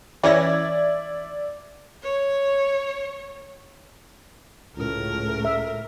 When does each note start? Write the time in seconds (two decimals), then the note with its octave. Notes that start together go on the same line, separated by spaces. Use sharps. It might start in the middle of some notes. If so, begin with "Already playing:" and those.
0.23 E3 C#4 D5 E5 G#6 A#6
2.03 C#5
4.77 C#2 A2 A3 A#4
5.45 E5